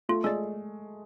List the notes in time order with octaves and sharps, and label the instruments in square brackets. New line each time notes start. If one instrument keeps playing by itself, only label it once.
[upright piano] A3 [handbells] F4
[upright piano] G#3 [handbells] A4 D5